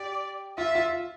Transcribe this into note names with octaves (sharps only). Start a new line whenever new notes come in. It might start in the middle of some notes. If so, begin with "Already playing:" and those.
Already playing: G4 D5
F4 E5
F4